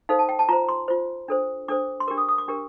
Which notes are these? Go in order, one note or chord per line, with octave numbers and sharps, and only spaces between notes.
D#4 A4 C5 F5
A5
G5
A5
F4 C5 A#5
C6
F4 C5
D4 A4 C5
D4 A4 C5 D6
C6
D4 G4 A#4 D6
D#6
D#6
D6
D4 G4 A#4